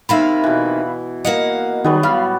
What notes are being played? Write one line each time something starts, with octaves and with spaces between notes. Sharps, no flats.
C3 D#3 A#3 E5 F5 B5
B2 E3
A#3 D#5 F5 F#5
D#3 F#3 G3 B3 D#4 G#4
A2 F5 B5 F6